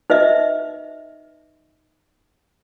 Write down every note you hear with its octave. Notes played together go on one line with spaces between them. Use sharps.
D#4 B4 D#5 E5